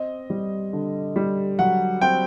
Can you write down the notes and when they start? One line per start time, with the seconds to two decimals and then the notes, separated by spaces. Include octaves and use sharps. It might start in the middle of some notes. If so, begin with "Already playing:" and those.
Already playing: C4 D#5
0.30 G3
0.73 D3
1.16 G3
1.59 F#3 F#5
2.01 C4 G5